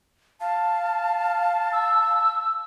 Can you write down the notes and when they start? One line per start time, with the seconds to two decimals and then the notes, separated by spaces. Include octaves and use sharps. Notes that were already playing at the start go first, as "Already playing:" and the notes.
0.41 F5 A5
1.73 E6